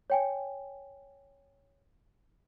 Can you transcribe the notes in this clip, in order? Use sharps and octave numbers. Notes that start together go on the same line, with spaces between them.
C#5 G5 G#5